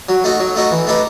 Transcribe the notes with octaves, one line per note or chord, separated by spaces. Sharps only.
F#3
A3 D#4 F#4
F#3
A3 D#4 F#4
E3
A3 D#4 G4 B4